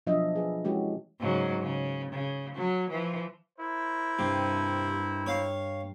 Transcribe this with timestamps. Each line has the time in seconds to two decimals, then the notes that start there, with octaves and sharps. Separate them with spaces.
0.07 B2 F3 F#3 D4 D#5 E5
0.36 G#4 B4
0.65 E3 G#3 C#4 F#4 G4
1.19 G#2 C#3 F#3
1.60 C#3
2.12 C#3
2.55 F#3
2.90 E3 F3
3.58 E4 A#4 C5
4.19 G2 C3
5.26 C#5 F5